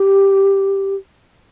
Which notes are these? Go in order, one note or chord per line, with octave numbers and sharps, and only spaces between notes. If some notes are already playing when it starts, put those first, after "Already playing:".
Already playing: G4